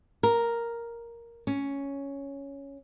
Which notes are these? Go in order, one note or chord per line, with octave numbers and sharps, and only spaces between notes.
A#4
C#4